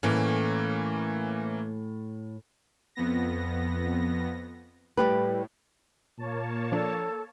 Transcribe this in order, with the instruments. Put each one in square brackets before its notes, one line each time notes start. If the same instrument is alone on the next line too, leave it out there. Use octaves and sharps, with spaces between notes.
[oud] A2 [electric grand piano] E3 A#3 C#4
[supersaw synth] F2 B3 A#6
[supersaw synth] A2 [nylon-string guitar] G3 G4 B4
[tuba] A#2 [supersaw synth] A#3 C#5 A5
[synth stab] F3 D4 [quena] A4